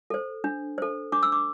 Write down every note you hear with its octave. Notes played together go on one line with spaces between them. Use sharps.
A4 C5
D4
A4 C5
D4 D6
E6
D6